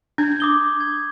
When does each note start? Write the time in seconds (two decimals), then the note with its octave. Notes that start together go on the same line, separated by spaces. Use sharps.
0.18 D4 G6 G#6
0.40 D6 D#6 G7
0.80 G#6